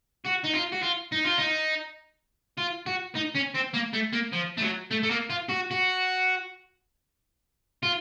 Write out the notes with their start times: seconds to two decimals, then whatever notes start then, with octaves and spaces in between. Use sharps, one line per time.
0.25 F#4
0.44 D#4
0.54 F4
0.73 F#4
0.83 F4
1.12 D#4
1.24 F4
1.38 D#4
2.58 F4
2.86 F#4
3.16 D#4
3.35 C#4
3.55 C4
3.74 A#3
3.94 A3
4.13 A#3
4.33 F3
4.58 A3
4.62 F#3
4.91 A3
5.03 A3
5.10 A#3
5.30 F4
5.49 F#4
5.71 F#4
7.83 F4